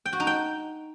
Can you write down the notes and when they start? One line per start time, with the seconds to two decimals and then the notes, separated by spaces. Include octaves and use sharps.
0.06 G5
0.13 F#4
0.20 D#4
0.27 G5